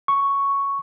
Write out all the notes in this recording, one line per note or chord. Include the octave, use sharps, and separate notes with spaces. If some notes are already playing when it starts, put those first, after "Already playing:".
C#6